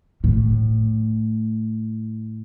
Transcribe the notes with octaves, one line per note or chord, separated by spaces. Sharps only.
A2